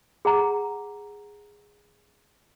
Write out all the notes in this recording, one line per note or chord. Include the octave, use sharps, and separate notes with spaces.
G#4 F#5 A#5